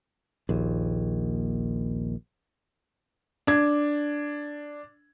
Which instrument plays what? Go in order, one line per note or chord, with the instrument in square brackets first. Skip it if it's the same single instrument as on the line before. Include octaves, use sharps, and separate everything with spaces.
[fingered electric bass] A#1 D#2
[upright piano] D4 G#6